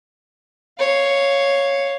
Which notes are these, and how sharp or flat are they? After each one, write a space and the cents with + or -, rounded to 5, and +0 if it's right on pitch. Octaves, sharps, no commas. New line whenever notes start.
C#5 +0 F5 +5